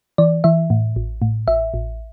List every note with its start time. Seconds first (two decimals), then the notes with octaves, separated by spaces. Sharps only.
0.18 E3 D5
0.44 E3 E5
0.70 A2
0.96 A1
1.22 A2
1.48 A1 E5
1.74 A1